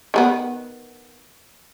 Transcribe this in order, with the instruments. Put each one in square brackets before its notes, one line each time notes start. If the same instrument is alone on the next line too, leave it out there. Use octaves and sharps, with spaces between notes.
[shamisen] D#3 G#3 B3